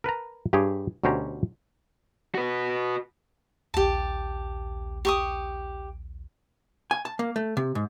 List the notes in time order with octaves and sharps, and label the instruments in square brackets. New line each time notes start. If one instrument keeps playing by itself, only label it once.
[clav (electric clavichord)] A#4 B4 A5 A#5
G2 G4 G#4 C#5
D2 B2 C#4 G4 C5 A#5
[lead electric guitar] F#4 B4
[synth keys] A#1 D#2 [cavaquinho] G4 A5
[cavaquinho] G4 C#6 D#6
[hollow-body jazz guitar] G#5
A5
A#3
A3
C3
G#2